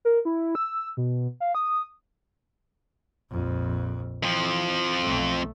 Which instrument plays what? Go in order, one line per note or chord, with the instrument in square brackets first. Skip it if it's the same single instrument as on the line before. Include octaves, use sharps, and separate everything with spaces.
[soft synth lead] A#4
E4
E6
B2
F5
D#6
[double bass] A#1 F2
[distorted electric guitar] F2 F3 [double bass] E3
[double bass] B1 A3